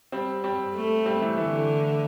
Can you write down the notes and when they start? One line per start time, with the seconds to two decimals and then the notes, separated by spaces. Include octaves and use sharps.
0.12 G3 C4
0.44 G3 C4
0.75 A3
1.05 G3 C4
1.21 E3 A3
1.37 D3 E3 A3